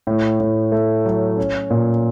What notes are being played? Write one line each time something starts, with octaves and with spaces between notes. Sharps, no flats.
A2
A2
A3
F#3
C#4
A#2